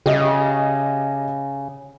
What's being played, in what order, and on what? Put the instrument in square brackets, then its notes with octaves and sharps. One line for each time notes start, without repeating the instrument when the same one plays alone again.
[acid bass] C#3 [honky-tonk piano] G4 D#5 E5